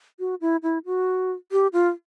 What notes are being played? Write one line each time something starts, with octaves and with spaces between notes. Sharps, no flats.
F#4
E4
E4
F#4
G4
F4